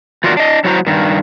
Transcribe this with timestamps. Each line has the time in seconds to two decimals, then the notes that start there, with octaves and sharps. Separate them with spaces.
0.24 E3 F4 F#4 A#4 D5
0.37 D4 D#5
0.64 F#3 E4 F#4 C5 A#5
0.86 G2 D#3